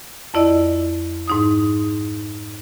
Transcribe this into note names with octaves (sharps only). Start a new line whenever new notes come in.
F2 E4 D5 D#5 E6
G#2 D#4 D#6